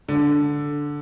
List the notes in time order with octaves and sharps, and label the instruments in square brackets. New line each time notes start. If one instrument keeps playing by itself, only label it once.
[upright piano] D3